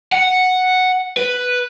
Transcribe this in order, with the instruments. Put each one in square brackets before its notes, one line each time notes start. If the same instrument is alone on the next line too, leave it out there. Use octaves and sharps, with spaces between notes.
[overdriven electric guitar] F#5
B4